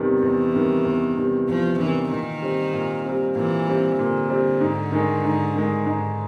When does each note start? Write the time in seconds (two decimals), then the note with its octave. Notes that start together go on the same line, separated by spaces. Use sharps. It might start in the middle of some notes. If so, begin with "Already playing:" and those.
Already playing: E2 C3 D#3 G3
0.22 E2 E3
0.54 C3 D#3 G3
0.85 E2
1.17 C3 D#3 G3
1.48 E2 F3
1.79 C3 D#3 E3 G3
2.10 A#2 D#3
2.42 G3 C4
2.73 A#2
3.05 G3 C4
3.36 A#2 E3
3.67 G3 C4
3.99 A#2 D3
4.30 G3 C4
4.61 G#2
4.92 D#3 G#3
5.25 G#2
5.55 D#3 G#3
5.86 G#2